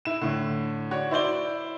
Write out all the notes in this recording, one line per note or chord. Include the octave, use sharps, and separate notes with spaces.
E4 E7
A2 D3
F#4 C#5 D5
E4 C5 D5 G7